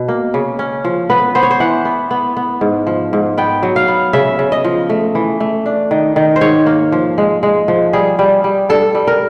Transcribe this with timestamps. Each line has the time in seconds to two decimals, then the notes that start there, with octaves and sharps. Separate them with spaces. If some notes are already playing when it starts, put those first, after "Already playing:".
Already playing: B2
0.08 A#3
0.34 C#3
0.59 C#4
0.85 F3
1.10 B3 B4
1.35 B3 C5
1.43 C#5
1.51 C5
1.60 E3 F#5
1.85 B3
2.11 B3
2.37 B3
2.61 G#2
2.87 F3
3.13 G#2
3.38 B3 G5
3.63 F#3
3.76 F5
3.88 B3
4.13 C#3 E5
4.39 C#3
4.52 D#5
4.64 F3
4.89 A3
5.15 E3
5.40 A3
5.66 D4
5.91 D#3
6.16 D#3
6.36 C5
6.41 G#2 C#5
6.66 A#3
6.92 F3
7.18 G#3
7.43 G#3
7.68 F3
7.93 G3 G#4
8.19 G3
8.44 G3
8.69 G2 A4
8.95 G3
9.07 A#4